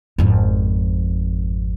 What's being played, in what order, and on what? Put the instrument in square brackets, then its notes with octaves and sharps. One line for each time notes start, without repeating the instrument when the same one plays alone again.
[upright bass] G#1 F2